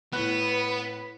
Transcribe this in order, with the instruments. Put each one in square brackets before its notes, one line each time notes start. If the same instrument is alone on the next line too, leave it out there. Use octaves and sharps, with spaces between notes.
[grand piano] A2 F#6 [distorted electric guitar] B3 [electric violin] B4